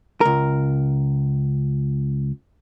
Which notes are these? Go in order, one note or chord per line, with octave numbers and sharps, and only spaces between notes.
C#2 A#4